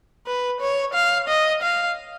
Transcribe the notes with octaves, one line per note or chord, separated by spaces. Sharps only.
B4
C#5
F5
D#5
F5